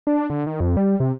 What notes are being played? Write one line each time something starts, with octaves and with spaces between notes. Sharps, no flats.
D4
D3
D#3
F2
G3
C3